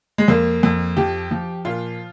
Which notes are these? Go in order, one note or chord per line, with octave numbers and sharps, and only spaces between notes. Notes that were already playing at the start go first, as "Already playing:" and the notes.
G#3
F2 A#3
F2
F3 G4
F3
A#2 F4